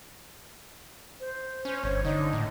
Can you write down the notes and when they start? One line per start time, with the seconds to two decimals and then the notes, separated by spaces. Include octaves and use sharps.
1.20 C5
1.65 C#4 C5
1.84 G1 C#5
2.04 D3 D#4
2.33 A2